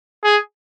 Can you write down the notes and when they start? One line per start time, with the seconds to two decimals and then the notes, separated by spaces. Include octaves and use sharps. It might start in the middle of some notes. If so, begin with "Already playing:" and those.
0.24 G#4